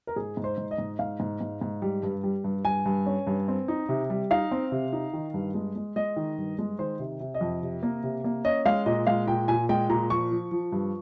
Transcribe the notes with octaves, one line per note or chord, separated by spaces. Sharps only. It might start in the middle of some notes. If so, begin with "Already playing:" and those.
A#4
G#2 G#4
G#2
C5
G#2
D#5
G#2
G#2 F5
G#2
G#2
G#2
G3
G2
G3
G2
G2 G#5
G2
C#4
G2
C4
D#4
C3
G3
D#4 F5
C4
C3
D#4
D#3
G2
G#3
G#3
G#3 D#5
D#3
G2
G#3
D#3 C5
C3
C3
D#5
F2
C3
A#3
C3
A#3
C#4 D#5
G#3 F5
A#2 D#5
G#3 F5
A#2 G5
A#2 G#5
G#3 G5
A#2 A#5
F3 C#6
F3
F3
G2